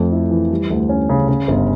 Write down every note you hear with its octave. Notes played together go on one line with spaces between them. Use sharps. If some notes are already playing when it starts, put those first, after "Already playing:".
Already playing: F2 A3
E4
E3
G3
D2
C#4
C#3
C#3
G1